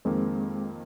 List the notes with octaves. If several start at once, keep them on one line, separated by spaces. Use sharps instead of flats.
F2 D#3 G#3 A#3 C4